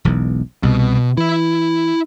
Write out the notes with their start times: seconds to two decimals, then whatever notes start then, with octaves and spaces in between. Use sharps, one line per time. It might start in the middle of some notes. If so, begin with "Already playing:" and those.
0.05 E1 B1 E2
0.63 C2 B2
1.17 E3 E4 B5